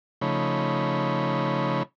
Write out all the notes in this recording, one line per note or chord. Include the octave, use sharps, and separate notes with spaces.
C#3 F3 A3 D#4 C#5 B5